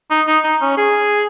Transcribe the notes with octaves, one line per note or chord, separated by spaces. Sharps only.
D#4
D#4
D#4
C#4
G#4